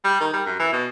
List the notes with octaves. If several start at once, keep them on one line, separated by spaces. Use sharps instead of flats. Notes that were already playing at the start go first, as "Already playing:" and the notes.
G3
D#3
G3
F#2
E3
B2